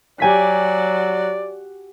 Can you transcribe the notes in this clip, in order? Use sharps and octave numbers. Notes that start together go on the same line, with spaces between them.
F#3 G4 D5 G#5 B6